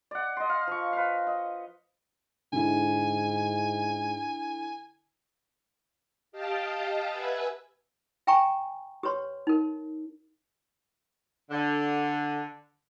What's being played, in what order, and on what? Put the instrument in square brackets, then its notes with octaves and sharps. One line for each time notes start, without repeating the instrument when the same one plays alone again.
[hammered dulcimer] D5 F#5
D#5 C6
F5
F3 C#6
B4 F5
D#5
[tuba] G#2 [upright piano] D3 E4 [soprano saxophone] G#5
[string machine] G4 D#5 F5 G5 A5
B4 E5 F#5 G#5
[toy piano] E5 G5 G#5 A#5 C#6
G4 B4 C#5 C6
D#4 A#4
[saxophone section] D3